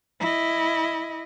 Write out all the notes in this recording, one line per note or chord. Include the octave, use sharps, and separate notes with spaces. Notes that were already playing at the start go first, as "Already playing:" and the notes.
E4 D#5